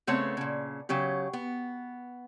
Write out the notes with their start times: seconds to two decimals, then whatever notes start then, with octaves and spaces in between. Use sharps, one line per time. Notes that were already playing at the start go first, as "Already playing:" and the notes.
0.07 C#3 A3 B3 C4 C#5
0.37 A#2 C#3
0.89 C#3 F#3 C#4 G4
1.33 B3